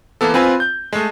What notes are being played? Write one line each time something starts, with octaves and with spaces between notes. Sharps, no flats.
E3 A#3 B3 A4
C4 F4 B4 G#5
G6
G#3 A3